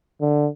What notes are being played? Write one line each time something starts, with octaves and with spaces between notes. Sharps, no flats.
D3